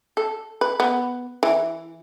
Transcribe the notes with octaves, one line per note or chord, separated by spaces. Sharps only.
A4
B4
B3
E3